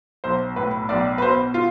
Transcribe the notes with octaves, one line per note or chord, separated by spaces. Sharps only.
B1 C5
A2 B4
B1 D5
B4
B2 C5
F4